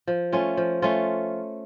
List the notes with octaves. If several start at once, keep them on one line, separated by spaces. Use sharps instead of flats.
F3
A3 C#4 F4
F3
A3 C#4 F4